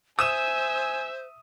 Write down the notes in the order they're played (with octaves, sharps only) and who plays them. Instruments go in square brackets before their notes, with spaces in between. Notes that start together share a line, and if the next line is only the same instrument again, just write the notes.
[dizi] C5 [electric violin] E5 E6 [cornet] G#5 [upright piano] D#6 E7